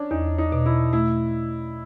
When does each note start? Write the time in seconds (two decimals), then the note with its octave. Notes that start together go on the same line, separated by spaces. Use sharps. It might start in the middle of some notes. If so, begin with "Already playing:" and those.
Already playing: C#4 D4
0.11 E2 D#4
0.38 D#4
0.52 B2
0.66 E4
0.93 A3 E4